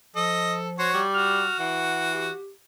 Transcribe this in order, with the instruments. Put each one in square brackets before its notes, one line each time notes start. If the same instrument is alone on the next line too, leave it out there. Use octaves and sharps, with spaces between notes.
[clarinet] F3 [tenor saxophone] A4 [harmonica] D#5
[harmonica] F#4 C#5 [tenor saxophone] C5
[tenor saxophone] G3
[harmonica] F#4 [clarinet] F6
[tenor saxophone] E3 [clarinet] F#5
[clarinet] G4